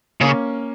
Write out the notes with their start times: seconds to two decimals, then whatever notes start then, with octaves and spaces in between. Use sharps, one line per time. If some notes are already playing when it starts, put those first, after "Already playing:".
0.21 C#3 A#3 C#4